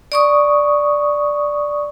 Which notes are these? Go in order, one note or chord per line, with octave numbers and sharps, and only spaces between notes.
D5 C#6 D#6